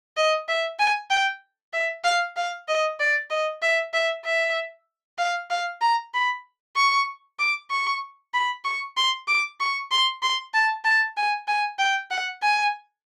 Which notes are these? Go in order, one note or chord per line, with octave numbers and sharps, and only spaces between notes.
D#5
E5
G#5
G5
E5
F5
F5
D#5
D5
D#5
E5
E5
E5
F5
F5
A#5
B5
C#6
D6
C#6
B5
C#6
C6
D6
C#6
C6
C6
A5
A5
G#5
G#5
G5
F#5
G#5